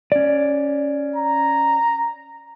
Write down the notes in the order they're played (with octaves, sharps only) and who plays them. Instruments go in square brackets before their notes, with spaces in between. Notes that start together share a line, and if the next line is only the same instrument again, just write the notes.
[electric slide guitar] C#4 D5
[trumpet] A#5